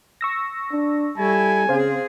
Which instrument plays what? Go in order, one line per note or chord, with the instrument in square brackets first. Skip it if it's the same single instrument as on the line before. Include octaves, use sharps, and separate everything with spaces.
[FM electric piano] C#6 E6 A#6
[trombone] D4
[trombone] G3 [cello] E4 A4 [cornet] G#5
[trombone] C#3 [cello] C4 G#4 [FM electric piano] C5 F5